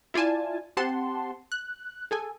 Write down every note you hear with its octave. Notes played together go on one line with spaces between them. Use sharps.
E4 F4 D5 G#5 A5
C4 G4 F#5 A5 C6
F#6
G#4 A4 G#5